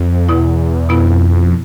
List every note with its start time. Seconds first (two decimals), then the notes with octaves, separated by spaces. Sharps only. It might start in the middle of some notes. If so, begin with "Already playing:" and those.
Already playing: F2
0.29 E2 B2 B3 E4
0.89 F2 B2 B3 E4